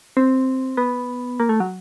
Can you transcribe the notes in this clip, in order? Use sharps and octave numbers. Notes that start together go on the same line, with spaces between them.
C4
B3
A#3
A3
F#3